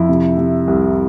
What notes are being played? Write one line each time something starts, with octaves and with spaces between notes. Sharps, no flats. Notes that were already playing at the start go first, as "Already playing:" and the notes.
Already playing: F2 E4
C3
C3
C2